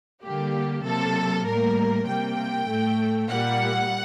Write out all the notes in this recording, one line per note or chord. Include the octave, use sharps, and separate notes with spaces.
D3 G3 A#3 G4
C3 F#3 A#3 A4
A2 G3 A#3 A#4
C3 G3 A#3 G5
A2 A3
A#2 G3 A#3 F#5